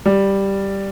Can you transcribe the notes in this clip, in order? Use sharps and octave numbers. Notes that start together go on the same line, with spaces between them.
G3